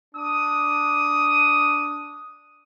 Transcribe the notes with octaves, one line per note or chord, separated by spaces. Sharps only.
D4 D#6